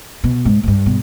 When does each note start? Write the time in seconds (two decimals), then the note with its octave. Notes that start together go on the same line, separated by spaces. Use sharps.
0.24 B2
0.45 G#2
0.63 G#2
0.68 G2
0.86 B2